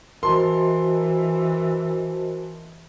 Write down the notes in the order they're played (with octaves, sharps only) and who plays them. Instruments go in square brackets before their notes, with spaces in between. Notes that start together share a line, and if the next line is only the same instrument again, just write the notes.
[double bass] E3 [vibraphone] F#4 C5 D#5 [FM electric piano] A#4 A5 [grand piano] C6